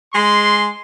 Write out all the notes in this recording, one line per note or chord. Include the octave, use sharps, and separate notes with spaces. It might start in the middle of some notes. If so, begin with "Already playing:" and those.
G#3 C6